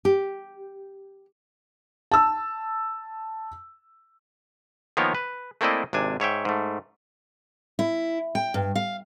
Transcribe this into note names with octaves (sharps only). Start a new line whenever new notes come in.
G4
A5 E6
D#3 F3 A#3 B3 A#4 C#5
B4
A3 A#3 C4 E4 D5 D#5
G#1 C3 D4 G#5
G#2 C#5 E5 G5
G#2 A3
E4
G5
G2
F5